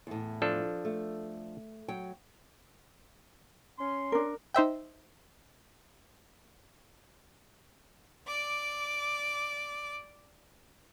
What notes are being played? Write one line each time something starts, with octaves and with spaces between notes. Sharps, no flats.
E2 A2
F3 D4 A4
A3
F#3 G5
C#4 C6
D4 A#4
D#4 C5 E5 G5
D5 D6